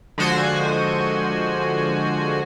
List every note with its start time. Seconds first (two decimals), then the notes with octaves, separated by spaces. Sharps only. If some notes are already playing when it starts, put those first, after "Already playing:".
0.18 D3 F3 G#3 F#4 C5 G#5